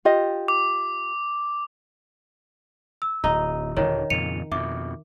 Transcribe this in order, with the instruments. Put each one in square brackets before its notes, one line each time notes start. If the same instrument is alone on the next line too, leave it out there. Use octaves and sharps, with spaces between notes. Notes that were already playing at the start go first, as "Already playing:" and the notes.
[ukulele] F4 G4 D#5
[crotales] D6
[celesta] E6
[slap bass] D1 [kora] D#4
[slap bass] D#1 D3 [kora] D#3 [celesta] C#5
[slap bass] F2 A#2 C#3 [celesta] C#7 D#7 F7
[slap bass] F2 B2 [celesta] E5 D6